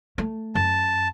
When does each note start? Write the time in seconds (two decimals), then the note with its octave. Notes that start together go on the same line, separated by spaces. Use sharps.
0.18 A3
0.55 F#2 A5